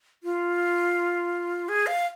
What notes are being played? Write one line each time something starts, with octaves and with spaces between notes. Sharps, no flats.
F4
G#4
F5